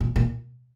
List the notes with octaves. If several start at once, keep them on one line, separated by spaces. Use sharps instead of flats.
A#2
A#2